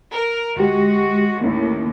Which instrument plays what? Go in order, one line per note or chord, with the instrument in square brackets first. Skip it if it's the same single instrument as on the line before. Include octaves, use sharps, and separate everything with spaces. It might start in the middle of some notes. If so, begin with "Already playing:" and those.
[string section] A#4
[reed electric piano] D2 G4 [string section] G#3 F#4
[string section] D#2 A2 [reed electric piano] A#3 C#4 E4